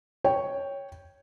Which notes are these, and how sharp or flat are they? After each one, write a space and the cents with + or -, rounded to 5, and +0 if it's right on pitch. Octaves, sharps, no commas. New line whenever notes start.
C#5 +0 G5 +0